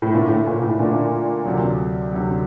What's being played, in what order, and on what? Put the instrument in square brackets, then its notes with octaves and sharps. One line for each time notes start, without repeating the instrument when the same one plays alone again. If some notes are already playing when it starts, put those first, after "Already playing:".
[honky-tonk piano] A2
[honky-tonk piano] A#2 [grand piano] D3 A3 D4
[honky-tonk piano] A2
A#2
A2
[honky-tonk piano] A#2 [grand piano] D3 A3 D4
[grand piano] D2 C3 F#3
D2 C3 F#3